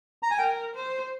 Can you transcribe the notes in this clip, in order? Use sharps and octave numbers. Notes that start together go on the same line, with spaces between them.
A#5
G#5
A#4 G5
C5